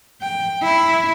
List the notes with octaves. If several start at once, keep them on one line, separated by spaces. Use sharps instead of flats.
G5
E4